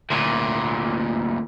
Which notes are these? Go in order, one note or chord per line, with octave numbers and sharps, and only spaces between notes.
D2 A#2